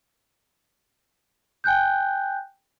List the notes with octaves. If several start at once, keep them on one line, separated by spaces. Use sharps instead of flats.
G5 G#5 F#6 G6